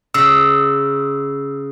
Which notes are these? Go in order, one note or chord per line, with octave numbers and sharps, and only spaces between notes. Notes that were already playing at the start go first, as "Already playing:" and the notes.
C#3 E6